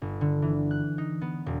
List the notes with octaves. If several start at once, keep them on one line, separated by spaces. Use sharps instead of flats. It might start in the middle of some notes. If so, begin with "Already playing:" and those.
G1
D3
E3
F#6
D#4
B3
E1